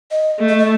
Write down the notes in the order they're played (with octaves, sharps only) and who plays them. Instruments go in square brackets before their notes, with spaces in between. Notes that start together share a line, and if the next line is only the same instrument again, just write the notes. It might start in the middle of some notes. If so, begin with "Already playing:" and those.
[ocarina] D#5
[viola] A3
[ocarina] D#5
D#5